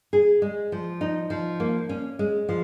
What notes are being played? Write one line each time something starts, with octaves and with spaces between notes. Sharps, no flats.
G#4
G#3
F3
D#4
F3
A#3
C#4
G#3
F3